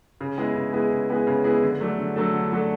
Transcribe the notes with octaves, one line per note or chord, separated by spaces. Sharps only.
C#3
G#3 B3 E4 G#4
C#3
G#3 B3 E4 G#4
C#3
G#3 B3 E4 G#4
C#3
G#3 B3 E4 G#4
D3
F#3 A3 D4 A4
D3
F#3 A3 D4 A4
D3
F#3 A3 D4 A4